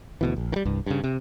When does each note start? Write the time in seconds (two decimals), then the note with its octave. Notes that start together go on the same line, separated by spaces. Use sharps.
0.21 D2 B2 E3
0.37 A#1
0.52 D#3 G3
0.65 C2 G2
0.86 G2 C#3
1.04 C3